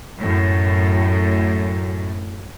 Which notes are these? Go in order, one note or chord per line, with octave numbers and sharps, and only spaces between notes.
F#2 A2